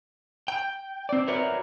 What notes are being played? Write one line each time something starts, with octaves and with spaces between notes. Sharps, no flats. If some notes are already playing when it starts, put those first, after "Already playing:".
G5
C4 D5
F#4 A#4 B4 C#5 D5 E5